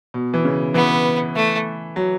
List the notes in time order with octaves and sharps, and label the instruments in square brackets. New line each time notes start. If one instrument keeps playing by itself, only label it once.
[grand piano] B2
E3
C#3
[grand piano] E3 [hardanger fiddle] B3
[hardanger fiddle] A3
[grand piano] F#3